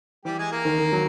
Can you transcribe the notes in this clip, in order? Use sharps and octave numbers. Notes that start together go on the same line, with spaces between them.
E3 G3 G4
G#3 G#4
A#3 A#4
D#3
D#3
F#3